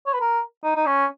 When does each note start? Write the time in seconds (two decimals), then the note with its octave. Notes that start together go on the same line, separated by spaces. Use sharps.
0.06 C#5
0.13 B4
0.20 A#4
0.64 D#4
0.76 D#4
0.86 C#4